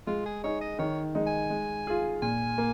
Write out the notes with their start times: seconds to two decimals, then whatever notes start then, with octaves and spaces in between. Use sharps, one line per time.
0.07 G#3 F4
0.26 G#4
0.44 D#4 G#4 C#5
0.61 D#5
0.79 D#3 C#5
1.15 G#3 D#4
1.27 G#5
1.50 G#3
1.87 F4 G#4
2.22 A#2 G#5
2.58 A#3